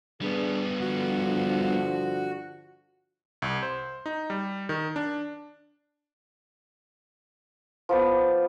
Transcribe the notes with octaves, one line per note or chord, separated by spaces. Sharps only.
G3 B3 D4 G#4
G2 D3 F3 F#4
C2
C5
D#4
G3
D#3
D4
F3 B3 D5